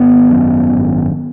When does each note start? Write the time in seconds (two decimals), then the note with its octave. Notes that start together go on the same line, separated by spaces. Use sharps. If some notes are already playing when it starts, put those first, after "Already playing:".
Already playing: G#1 B3
0.30 F#2
0.73 G#1